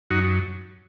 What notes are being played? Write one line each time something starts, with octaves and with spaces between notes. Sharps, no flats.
F#2 D#4 F#4